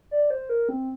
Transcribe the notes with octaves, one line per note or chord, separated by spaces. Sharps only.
D5
C5
A#4
C4